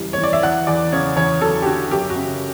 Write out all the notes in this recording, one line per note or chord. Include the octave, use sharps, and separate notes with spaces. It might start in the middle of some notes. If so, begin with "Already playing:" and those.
Already playing: E1 C#3 E3 G3
C#5
E3
D5
E5
E2 F#5
E2 D5
C#3 C#5
E2 C#5
F#3 A4
G4
D3 F#4
F#2 G4
F#4
C#3